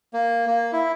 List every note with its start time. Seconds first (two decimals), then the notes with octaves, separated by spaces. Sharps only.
0.14 A#3
0.47 A#3
0.73 E4